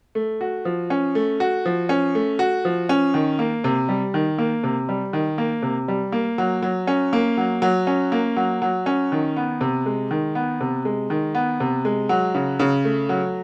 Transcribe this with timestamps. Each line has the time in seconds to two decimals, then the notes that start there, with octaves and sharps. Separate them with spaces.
0.15 A3
0.41 F#4
0.65 F3
0.90 C#4
1.15 A3
1.40 F#4
1.66 F3
1.89 C#4
2.15 A3
2.39 F#4
2.65 F3
2.89 C#4
3.14 D#3
3.39 A#3
3.64 C3
3.89 G3
4.14 D#3
4.38 A#3
4.64 C3
4.89 G3
5.13 D#3
5.38 A#3
5.62 C3
5.88 G3
6.12 A#3
6.38 F#3
6.63 F#3
6.87 C#4
7.13 A#3
7.37 F#3
7.62 F#3
7.87 C#4
8.12 A#3
8.37 F#3
8.62 F#3
8.86 C#4
9.12 D#3
9.37 B3
9.61 C3
9.86 G#3
10.11 D#3
10.35 B3
10.61 C3
10.85 G#3
11.10 D#3
11.35 B3
11.60 C3
11.85 G#3
12.09 F#3
12.35 C#3
12.60 C#3
12.85 A3
13.09 F#3